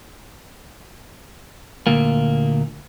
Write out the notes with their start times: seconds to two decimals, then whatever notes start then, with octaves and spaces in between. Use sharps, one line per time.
1.87 D2 A#2 A#3